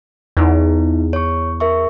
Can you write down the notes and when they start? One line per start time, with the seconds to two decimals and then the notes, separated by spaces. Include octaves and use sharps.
0.37 E2 B3 D#4 E4
1.13 C#5 C#6
1.60 A#4 E5 C#6